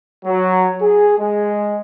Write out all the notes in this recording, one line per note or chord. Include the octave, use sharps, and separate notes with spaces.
F#3
G#4
G#3